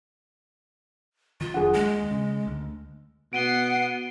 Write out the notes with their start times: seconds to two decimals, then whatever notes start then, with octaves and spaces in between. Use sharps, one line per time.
1.41 D#3 F4
1.54 F1 F#3 D4 G#4 F#5
1.73 D#2 G#3
2.11 C#3
2.47 D2
3.33 B2 B3 F#5 C7 D7 D#7 G7